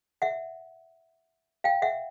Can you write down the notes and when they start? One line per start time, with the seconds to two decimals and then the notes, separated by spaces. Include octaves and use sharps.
0.22 E5 F#5
1.64 F5 G5
1.82 E5 F#5